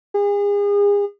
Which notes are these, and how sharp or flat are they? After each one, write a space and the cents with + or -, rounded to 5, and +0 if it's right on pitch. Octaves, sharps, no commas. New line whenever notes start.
G#4 -35